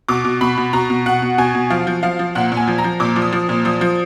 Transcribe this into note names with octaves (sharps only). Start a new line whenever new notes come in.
B2 D6
B2
B2 B5
B2
B2 A#5
B2
B2 F#5
B2
B2 G#5
B2
F3 F5
F3
F3 F5
F3
A#2 F#5
A#2
G#5
F3
A#5
F3
A#2 D6
F3
D#6
F3
A#2
F3 D#6
F3